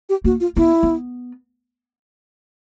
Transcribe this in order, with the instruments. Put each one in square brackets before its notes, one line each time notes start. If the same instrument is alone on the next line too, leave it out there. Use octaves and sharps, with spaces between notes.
[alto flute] G4
[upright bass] A#3 [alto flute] F#4
[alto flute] F4
[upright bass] B3 [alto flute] E4
[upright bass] B3